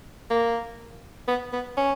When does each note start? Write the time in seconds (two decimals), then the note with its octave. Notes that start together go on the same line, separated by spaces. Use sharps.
0.30 A#3
1.28 B3
1.53 B3
1.77 C#4